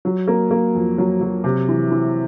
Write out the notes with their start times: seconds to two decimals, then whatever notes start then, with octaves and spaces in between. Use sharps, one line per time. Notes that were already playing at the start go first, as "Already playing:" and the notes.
0.05 F#3
0.28 A#3
0.51 A#3
0.75 F2
0.98 F#3
1.21 F#3
1.44 C3
1.68 E3
1.91 E3